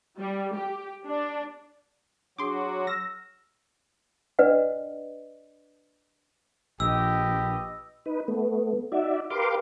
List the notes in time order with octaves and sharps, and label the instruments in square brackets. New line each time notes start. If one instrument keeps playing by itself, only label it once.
[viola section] G3
G4
D4
[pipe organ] F#3 F#4 [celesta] D4 G#4 D#6 [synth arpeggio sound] C6 D6
[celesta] E6 F6 E7 [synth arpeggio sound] A#6
[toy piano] D4 B4 D5 D#5 F#5
[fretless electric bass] A#1 [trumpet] G4 [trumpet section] B4 D#5 [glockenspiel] E6
[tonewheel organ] D#4 B4
A3 B3
D#4 F#4 D5 E5
G4 A#4 B4 F5 C6 D6